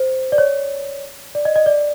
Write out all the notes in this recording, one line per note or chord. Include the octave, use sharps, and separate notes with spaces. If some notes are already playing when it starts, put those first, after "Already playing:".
Already playing: C5
D5
C#5
D5
D#5
D#5
D5